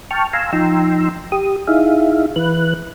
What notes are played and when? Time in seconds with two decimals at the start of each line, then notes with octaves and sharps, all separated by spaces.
0.11 G5 A5 C#6 F6
0.33 F5 G#5 A#5 C6 E6
0.53 F3 D#4 G5 A#5 C6 E6
1.32 G4 D#6
1.68 D#4 E4 G#4 E5 F5
2.36 E3 B4 F#6